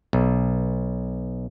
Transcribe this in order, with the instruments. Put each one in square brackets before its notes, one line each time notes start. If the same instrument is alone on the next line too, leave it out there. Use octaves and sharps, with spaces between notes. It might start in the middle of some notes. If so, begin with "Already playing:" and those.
[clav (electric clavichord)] B1